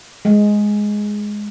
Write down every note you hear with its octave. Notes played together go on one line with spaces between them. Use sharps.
G#3